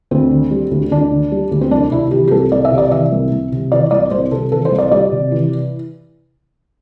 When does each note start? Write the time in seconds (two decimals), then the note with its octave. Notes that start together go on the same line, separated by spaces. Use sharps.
0.11 D2 C4
0.31 D3
0.51 G3
0.71 D2
0.91 D2 D4
1.12 D3
1.32 G3
1.51 D2
1.61 C4
1.71 C2 D4
1.92 C3 E4
2.11 E3 G4
2.27 G4
2.31 C2 A4
2.51 C2 D5
2.65 E5
2.72 C3
2.78 D5
2.91 E3 E5
3.12 C2
3.31 C2
3.52 C3
3.71 E3 D5
3.91 C2 D5
4.11 C2 C5
4.31 C3 A4
4.52 E3 A4
4.65 C5
4.71 C2
4.78 D5
4.92 G3 D5
5.12 C3
5.31 E3